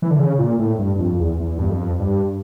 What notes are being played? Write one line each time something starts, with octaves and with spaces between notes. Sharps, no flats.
E3
D3
C#3
A#2
A2
G2
F2
E2
E2
G2
F2
G2